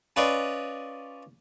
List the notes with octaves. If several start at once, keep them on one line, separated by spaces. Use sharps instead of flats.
C#4 F4 B4 D5 D#5